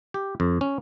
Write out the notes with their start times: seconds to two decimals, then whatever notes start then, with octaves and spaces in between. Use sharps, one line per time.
0.14 G4
0.40 F2
0.61 C#4